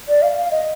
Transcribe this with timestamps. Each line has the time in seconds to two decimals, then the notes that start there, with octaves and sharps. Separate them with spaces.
0.08 D5
0.22 F5
0.37 F5
0.51 D#5